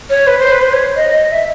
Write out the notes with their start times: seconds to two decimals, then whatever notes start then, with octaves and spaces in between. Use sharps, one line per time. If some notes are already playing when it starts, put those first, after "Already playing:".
0.09 C#5
0.27 B4
0.38 C5
0.51 B4
0.61 C5
0.73 C#5
0.96 D#5
1.13 D#5
1.31 E5